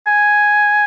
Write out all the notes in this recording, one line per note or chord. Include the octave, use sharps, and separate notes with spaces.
G#5